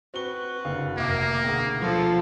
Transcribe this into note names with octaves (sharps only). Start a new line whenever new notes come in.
C4 F#4 B4 G7
F#1 D3 F5
F1 A#3 E5 D6
D2 B2 G#4
F3 A4 C5